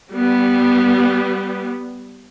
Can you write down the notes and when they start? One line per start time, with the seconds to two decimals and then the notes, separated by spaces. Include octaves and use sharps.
0.13 G3 B3